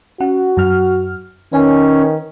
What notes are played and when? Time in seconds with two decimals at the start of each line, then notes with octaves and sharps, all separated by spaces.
0.20 C#4 F#4 F#5
0.57 F#2 F#3 F6
1.53 D#3 C#4 B4 C#5 G#5